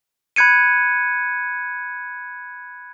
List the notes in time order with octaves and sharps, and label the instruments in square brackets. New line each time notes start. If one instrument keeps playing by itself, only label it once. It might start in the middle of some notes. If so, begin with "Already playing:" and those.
[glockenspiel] B5 F#6 G#6 C#7 D#7